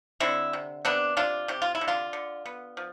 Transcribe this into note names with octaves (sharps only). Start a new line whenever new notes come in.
D3 C4 E4
C3
C3 B3 D4
C3 D4 F4
C3 G4
F4
E4
D3
D4 F4
D3
B3
F3